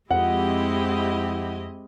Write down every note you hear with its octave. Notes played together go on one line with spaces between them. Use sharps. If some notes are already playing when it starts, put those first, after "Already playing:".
F2 G#3 C4 E4 G4 D#5 F#5